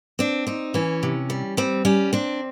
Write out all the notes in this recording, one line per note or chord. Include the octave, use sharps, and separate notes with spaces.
C4 D4
C4 D#4
E3 C#4
C3
G3
G3 C4
G3 C#4
C4 D4